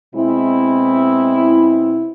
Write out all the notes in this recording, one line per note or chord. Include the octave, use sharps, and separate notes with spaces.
B2 G#3 B3 C4 E4